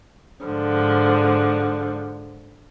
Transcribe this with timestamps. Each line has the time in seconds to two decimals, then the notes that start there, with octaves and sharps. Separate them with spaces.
0.43 G#2 D3 F3